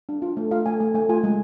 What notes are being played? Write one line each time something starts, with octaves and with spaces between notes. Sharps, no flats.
D4
F4
A3
F4 F5
A3 G#5
A3 G#5
A3 G#5
F4 G#5
G#3